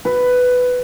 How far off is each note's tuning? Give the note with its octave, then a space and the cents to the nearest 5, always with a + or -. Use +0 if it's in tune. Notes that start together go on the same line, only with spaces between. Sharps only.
B4 +10